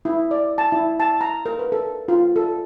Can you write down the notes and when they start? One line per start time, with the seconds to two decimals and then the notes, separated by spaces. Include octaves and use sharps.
0.05 E4
0.31 D5
0.58 A5
0.72 E4
1.00 A5
1.21 A#5
1.46 A#4
1.59 B4
1.72 A4
2.08 F4
2.36 A4